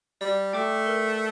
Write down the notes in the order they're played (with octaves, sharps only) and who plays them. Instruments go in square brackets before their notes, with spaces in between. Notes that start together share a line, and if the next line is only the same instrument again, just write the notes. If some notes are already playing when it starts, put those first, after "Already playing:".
[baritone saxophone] G3 [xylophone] D5
[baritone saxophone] A3 [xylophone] G5 D6
[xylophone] A#4